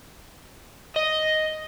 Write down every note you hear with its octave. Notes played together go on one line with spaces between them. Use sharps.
D#5